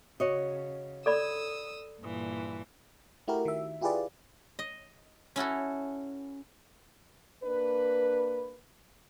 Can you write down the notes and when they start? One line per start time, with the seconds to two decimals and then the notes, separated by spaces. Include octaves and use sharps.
0.20 C#3 F#4 C#5 D#5
1.06 A4 D5 B5 D#6 E6
2.00 G2 A#2 E3
3.28 A3 E4 F#4 G4 A#4
3.45 D#3 E5
3.81 E4 F4 G4 G#4 B4 D5
4.59 D#5
5.36 C#4 E4 F#4 A4
7.44 A#3 D4 B4